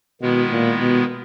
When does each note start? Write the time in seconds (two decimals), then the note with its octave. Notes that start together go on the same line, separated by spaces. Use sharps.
0.21 B2 D#3 G#3 B3 E4
0.52 A#2
0.80 B2